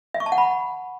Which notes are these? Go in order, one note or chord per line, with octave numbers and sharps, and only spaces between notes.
E5
C#6
A5
F#5
B5